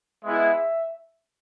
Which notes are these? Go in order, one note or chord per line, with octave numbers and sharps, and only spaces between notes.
G#3 B3 E4 G#4 E5